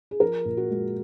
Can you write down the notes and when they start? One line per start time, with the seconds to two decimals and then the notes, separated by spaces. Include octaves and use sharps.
0.11 G#4
0.20 F3 A#4
0.45 A#2
0.57 F#4
0.70 G#3